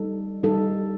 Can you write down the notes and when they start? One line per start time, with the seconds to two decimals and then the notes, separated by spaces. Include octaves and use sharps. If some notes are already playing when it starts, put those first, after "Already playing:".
Already playing: G3 D#4 A4
0.43 G3 D#4 A4